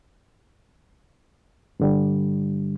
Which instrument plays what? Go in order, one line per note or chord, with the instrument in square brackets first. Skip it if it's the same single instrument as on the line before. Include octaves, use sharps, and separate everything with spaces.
[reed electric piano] G2 D3 G3